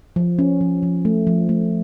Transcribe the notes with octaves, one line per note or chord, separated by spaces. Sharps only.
F3
C#4
F3
F3
A3
F3
A3